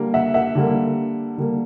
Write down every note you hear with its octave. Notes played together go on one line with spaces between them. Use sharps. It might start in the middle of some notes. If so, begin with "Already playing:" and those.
Already playing: D3 G3 A#3
E5 F#5
E5 F#5
D3 G3 A#3
D3 G3 A#3